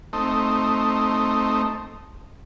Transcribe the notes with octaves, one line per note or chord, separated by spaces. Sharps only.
A3 C4 D#4